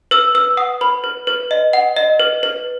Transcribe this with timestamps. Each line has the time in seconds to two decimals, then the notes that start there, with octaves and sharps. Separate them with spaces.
0.11 B4 E6
0.35 B4 E6
0.57 F#5 D#6
0.81 B4 B5
1.04 B4
1.27 B4
1.51 D#5
1.73 F#5
1.96 D#5
2.20 B4
2.43 B4